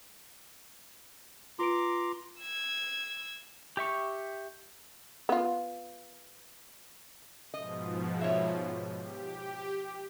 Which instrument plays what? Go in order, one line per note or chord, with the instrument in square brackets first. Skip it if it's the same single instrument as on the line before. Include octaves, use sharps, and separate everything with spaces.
[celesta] F4 B4 D7 [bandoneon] A#5 C6 D6
[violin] E6 G#6
[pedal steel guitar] G4 E5 C#6
[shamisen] B3 F4
[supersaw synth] G#2 B2 F3 [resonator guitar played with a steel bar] D#5
[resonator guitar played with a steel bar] C#5 E5
[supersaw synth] G4